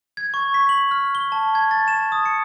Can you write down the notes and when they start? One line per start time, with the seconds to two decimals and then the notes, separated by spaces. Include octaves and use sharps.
0.17 G#6
0.34 C#6
0.54 B6
0.69 F#7
0.91 F6
1.15 G7
1.32 A5
1.55 G#6
1.71 A6
1.88 E7
2.12 D#6
2.26 C#7